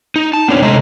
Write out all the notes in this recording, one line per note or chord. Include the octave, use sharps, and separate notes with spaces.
D#4
A5
B3 C4 D4 F4 C#5
C3 G#3 A3 D#5 A#5